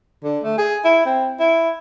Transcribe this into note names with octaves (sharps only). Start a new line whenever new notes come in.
D3
A3
G#4
E4
C4
E4